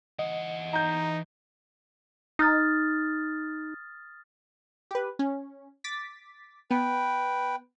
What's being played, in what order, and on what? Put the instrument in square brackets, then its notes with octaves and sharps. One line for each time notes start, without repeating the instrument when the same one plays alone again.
[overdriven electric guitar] E3 F#5 [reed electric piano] D#5
[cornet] D#4 [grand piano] A#5 G6
[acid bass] D#4 [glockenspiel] D#6 F6 A6
[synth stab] G4 B4
C#4
D6 A6 B6
[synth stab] B3 [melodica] B4 G5